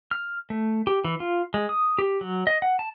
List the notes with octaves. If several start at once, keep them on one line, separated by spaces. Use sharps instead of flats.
F6
A3
G4
E3
F4
G#3
D#6
G4
F#3
D#5
F#5
A5